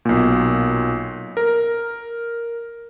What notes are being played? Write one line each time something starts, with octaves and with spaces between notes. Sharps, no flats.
B1 A#2
A#4